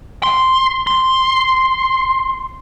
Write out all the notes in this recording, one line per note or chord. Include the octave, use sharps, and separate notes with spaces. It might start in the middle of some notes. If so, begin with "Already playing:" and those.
C6
C6